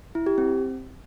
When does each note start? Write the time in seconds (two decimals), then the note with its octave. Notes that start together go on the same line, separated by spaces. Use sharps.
0.15 E4
0.26 G4
0.38 C4